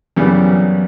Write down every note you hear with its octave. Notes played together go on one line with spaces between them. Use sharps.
F#2 C#3 E3 G3 B3